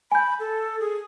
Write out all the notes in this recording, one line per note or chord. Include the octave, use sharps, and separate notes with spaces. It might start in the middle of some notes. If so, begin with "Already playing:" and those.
G#5 B5 G6
A4
G#4